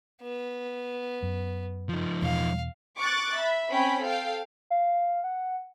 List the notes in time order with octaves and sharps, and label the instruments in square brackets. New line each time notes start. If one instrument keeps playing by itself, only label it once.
[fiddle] B3
[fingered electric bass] F#2
[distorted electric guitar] F3 D#4
[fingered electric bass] E2 B2 [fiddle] F5
[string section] C#6 D6 F#6 A6
E5 B5
C4 C#4 G5 B5
A4 F5 G5
[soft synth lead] F5
F#5